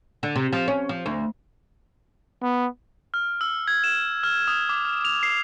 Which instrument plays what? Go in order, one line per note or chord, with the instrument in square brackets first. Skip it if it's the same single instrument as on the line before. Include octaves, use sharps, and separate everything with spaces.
[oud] D3
C3
F3
C#4
F3
D2
[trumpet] B3
[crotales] F6
E6
G#6
E7
F6
D#6
D6
F6
F7
C7